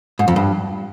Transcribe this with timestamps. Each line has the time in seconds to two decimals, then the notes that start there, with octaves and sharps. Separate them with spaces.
0.19 G#2
0.28 F2
0.36 G2